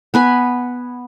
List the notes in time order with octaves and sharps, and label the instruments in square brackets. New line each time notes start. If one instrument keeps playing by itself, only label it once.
[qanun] B3 B4 G#5